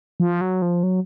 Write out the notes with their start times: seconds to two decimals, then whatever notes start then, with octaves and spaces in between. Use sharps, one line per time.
0.20 F3
0.41 F#3
0.62 F3
0.83 F#3